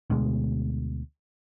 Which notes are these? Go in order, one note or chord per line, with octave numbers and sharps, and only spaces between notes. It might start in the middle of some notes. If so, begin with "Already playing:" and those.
D2 B2 G#3